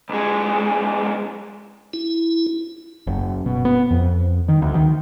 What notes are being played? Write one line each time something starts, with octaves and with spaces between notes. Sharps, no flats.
B1 G#3
E4
F#1
B2
B3
F2
D#3
D2
D#3